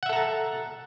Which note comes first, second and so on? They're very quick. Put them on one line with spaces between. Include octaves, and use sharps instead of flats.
F#5 E5 A4 A#5 A5